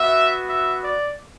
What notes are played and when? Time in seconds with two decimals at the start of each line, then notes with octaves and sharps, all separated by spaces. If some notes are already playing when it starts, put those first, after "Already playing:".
Already playing: B3 F#4 E5
0.49 E5
0.84 D5